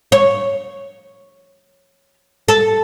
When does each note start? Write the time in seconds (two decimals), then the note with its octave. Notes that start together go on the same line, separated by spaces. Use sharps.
0.12 C#5
2.48 A4